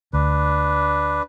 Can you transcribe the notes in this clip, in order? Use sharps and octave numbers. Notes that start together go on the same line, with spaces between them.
D2 D4 B4